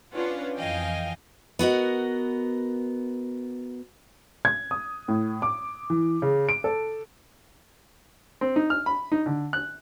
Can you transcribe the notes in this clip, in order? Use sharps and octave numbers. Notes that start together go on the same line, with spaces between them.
C#4 D4 F4 B4 F5 F#5
F2 E3 D#5 F5 G5 G#5
B3 F#4 A#4 D#5
G#6
D#6
A2
D6
E3
C#3
D7
A4
C4
D#4
F6
B5
D#4
D3
F#6